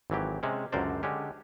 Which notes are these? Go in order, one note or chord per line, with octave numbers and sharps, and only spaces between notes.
G#1 E3 F#3 G4
C3 G#3 C#4
C#2 F#2 D3 A#4 C5 D5
D3 G#3 C#4 G4